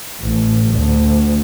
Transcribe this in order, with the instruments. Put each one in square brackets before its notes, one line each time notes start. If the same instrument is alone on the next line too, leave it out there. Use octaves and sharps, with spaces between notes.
[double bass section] A1
D2